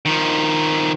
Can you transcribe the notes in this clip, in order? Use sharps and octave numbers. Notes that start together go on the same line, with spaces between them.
D#3 F3